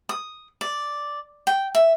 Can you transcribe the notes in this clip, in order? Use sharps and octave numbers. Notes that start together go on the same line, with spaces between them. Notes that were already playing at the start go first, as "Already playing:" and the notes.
D#6
D5
G5
E5